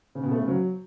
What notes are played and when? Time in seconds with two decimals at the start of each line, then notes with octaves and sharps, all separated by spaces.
0.15 C#3
0.23 B2
0.31 A3
0.40 C#3
0.48 F#3